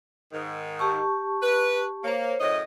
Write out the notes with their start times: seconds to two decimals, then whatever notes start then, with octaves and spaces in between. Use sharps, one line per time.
0.33 G#2 D#3
0.79 G4 A5 C#6
1.42 B4
2.04 A#3 C5 C#5
2.41 F#2 A2 D#5